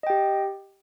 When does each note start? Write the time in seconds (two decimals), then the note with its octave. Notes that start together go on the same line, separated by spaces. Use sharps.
0.03 D#5
0.07 G5
0.10 G4